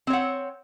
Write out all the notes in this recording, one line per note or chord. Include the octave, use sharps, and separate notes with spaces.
C4 C#5 F#5